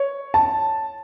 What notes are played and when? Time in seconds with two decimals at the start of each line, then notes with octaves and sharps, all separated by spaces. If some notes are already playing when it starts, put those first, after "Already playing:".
Already playing: C#5
0.34 A5